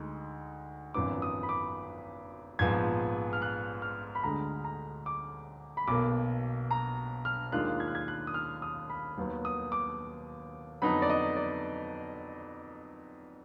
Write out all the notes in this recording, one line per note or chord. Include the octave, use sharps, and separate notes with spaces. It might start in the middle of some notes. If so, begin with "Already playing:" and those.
Already playing: D2 G#3 D#4
G#1 F#2 F3 B3 D#4 D6
D#6
B5
D6
A#1 G#2 F3 B3 G#6
F6
F#6
F6
B5
D2 D3 G#3 A#5
A#5
D6
B5
B1 B2 A#3 D6
A#5
F6
D#2 D#3 G#3 D4 F4 F#6
G#6
F#6
G#6
F#6
D#6
F6
D#6
B5
D#2 D#3 F#3 B3
D#6
D6
F2 D3 F#3 B3 D#4 B5
D5
D#5
D5